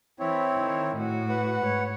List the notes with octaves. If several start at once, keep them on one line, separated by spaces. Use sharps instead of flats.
E3 C4 E4 C#5
D#3
A2 F#4
B4 F#5
G#2 C#5